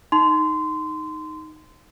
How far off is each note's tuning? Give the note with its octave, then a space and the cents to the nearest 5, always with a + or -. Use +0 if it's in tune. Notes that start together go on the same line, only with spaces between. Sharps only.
D#4 +0 C6 -20